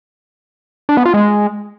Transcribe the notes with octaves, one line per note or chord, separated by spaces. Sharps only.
D4
B3
F4
G#3